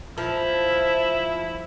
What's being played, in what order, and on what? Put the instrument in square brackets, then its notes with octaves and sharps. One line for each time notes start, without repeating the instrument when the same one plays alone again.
[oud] F3 [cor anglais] E4